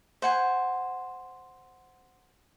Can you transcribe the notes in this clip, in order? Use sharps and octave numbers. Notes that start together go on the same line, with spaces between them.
C5 F#5 G#5